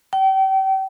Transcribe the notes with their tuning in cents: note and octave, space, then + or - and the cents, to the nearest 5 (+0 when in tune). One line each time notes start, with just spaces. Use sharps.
G5 -35